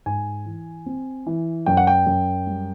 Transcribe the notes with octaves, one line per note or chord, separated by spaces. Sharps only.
G#2 G#5
E3
C4
E3
F#2 G5
F#5
G5
F#2
G3